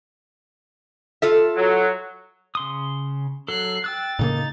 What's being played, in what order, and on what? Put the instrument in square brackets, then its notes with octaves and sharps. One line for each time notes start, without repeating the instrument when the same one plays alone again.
[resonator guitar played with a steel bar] F4 A4 E5
[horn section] F#3
[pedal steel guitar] C#3 C6 D#6
[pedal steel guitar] F#3 A4 [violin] F#6 C7
[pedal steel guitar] G5 E6 F#6 [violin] A6
[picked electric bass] A2 C#3 A#3 [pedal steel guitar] D#4